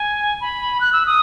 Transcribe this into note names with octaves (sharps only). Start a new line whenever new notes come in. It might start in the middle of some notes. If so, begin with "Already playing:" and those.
Already playing: G#5
B5
F#6
E6
D#6